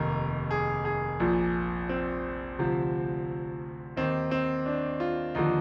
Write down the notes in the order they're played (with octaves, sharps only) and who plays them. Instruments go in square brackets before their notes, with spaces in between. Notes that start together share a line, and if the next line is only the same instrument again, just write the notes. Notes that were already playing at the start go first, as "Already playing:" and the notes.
Already playing: [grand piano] F1 D#2 D#3 A#4
G#4
G#4
A#1 A#2 F3
C4
D2 C3 F3
D#2 D#3 C4
C4
D4
F4
D#2 D3 F3 D#4